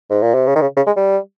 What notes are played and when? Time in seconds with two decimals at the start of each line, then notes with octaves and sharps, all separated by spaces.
0.10 G#2
0.22 A#2
0.34 C3
0.47 C#3
0.55 D#3
0.61 C#3
0.76 C#3
0.86 G#3
0.96 G3